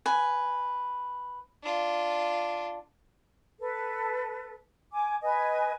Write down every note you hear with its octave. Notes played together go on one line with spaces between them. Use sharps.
B4 G#5
D4 F4
A4 B4
G#5 D6
B4 D#5 G#5